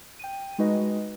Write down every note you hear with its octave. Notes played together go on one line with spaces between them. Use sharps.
G5 D#7
G#3 D#4 F#4 B4 D#5